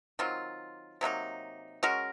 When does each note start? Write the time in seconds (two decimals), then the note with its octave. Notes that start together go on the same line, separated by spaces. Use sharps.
0.19 D#3 F#3 C4 F4
1.01 C3 F#3 A#3 D#4
1.83 G#3 C#4 F#4 A#4